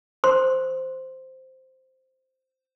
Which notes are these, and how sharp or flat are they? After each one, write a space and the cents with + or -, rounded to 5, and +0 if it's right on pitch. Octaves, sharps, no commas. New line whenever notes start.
C5 -5 C6 +0